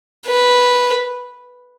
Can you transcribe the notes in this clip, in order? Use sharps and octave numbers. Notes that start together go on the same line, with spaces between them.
B4